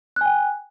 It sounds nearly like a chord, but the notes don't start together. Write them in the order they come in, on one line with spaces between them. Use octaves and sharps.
F#6 G#5 G5